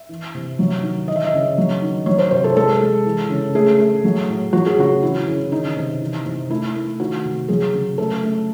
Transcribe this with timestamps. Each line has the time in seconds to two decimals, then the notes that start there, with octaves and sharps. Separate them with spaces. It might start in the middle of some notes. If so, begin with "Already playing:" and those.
Already playing: E5
0.09 E3
0.34 C3
0.59 F#3
0.83 D#3
1.08 E3 D#5
1.16 E5
1.25 D#5
1.33 C#3
1.58 F#3
1.82 D#3
2.06 F#3 C#5
2.18 C5
2.31 C3 C5
2.44 A4
2.56 G#3 A4
2.81 G#3
3.06 E3
3.30 C#3
3.55 A3 G#4
3.79 A3
4.04 F#3
4.29 A2
4.53 F#3 F#4
4.66 G#4
4.78 C#3 F#4
5.03 E3 E4
5.28 C#3
5.52 D#3 D#4
5.76 C3
6.01 E3
6.25 C3
6.50 A3 E4
6.75 A3
7.00 D#3 F#4
7.25 C3
7.49 F#3 G#4
7.74 C#3
7.98 A3 A4
8.24 A3